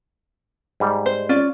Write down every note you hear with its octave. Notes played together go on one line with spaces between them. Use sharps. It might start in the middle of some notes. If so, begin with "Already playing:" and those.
G#2 G3
C5
C#4 F4 D5